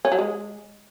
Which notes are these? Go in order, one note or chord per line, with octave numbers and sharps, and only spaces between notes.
C#4
F#3
G#3